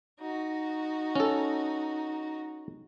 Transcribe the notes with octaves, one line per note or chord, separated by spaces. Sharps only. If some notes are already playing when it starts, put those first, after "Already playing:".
D#4 F#4
C#4 A4